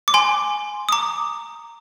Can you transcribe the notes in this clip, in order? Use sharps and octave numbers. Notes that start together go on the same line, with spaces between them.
D6
G#5 C6
D#6
A#5 D6